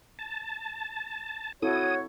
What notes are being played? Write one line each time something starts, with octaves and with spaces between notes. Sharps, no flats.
A5
C4 E4 F#4 A4 C#5 D#6